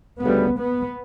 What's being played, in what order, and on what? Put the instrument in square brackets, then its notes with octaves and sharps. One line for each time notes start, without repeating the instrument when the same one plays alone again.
[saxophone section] D2 C#3 G3 [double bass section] B3
[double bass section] B3